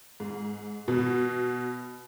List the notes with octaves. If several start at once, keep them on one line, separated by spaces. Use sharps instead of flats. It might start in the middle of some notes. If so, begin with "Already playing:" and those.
G#2
B2